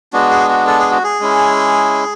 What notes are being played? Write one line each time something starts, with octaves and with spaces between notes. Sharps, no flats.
G#3 B3 D4 F#4
G#4
F#4
A4
G#4
F#4
G#4
G#3 C#4 E4